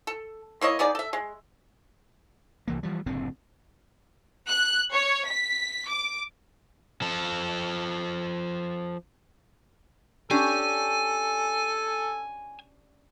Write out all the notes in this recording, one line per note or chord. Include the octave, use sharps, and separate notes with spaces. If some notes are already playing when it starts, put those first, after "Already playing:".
A4
A#3 E4 C#5 D#5
B3 D#4 G#4 D5
A4 E5
G#3
C2 E3 A#3
E3 F3 G3
F#1 A2 D3 C4
F#6
C#5
B6
D6
F3 A4
C#4 D4 G4 A4 G#5